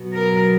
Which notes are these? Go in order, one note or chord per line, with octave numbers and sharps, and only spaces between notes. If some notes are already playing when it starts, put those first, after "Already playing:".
Already playing: B2 F#3 B3
A#4